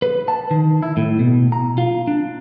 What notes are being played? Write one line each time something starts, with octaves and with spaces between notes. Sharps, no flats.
B4
A5
D#3
E4
A2
B2
A#5
F4
D4